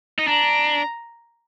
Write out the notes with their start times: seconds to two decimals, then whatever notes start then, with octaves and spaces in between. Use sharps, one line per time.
0.18 D#4
0.27 D4 A#5